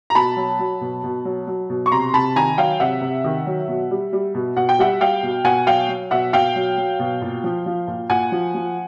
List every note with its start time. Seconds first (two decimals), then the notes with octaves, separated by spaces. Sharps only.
0.10 A#5
0.15 B2 A5 B5
0.37 F#3
0.59 F#3
0.81 B2
1.04 B2
1.25 F#3
1.47 F#3
1.70 B2
1.86 C#6
1.92 C3 A#5 C6
2.14 C3 A5 B5
2.36 D#3 G#5 A#5
2.58 F#3 F5 G5
2.80 C3 E5 F#5
3.01 C3
3.24 D#3
3.46 F#3
3.68 B2
3.91 G3
4.13 G3
4.35 B2
4.57 B2 F#5
4.69 G5
4.79 G3 E5 F#5
5.01 G3 F5 G5
5.23 B2
5.44 B2 F#5 G#5
5.67 F#3 F5 G5
5.89 F#3
6.11 B2 E5 F#5
6.33 B2 F5 G5
6.56 F#3
6.78 F#3
7.00 B2
7.21 A#2
7.44 F3
7.66 F3
7.88 A#2
8.10 A#2 F#5 G#5
8.32 F3
8.55 F3